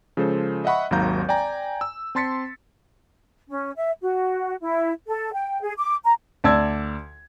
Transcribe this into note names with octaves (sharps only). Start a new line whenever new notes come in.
C#3 F3 G#3 A4 C5
D#5 E5 F#5 B5 C#6
G#1 D#2 F#3 F5 A#5 G6
D5 G5 G#5 A#5
E6
C4 A5 C6 A6 B6 C#7
C#4
E5
F#4
E4
A4
G5
G#4
D6
A#5
D2 D5 A5 E6 G#6